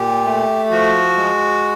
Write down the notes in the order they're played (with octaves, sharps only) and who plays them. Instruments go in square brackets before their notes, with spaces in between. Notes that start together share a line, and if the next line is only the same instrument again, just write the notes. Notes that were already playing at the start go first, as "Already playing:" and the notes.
Already playing: [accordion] A#2 G4
A3
F3 F#4
G#3